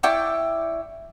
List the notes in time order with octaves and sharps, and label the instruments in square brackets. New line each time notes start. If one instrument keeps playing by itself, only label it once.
[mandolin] E4 D5 G5 C#6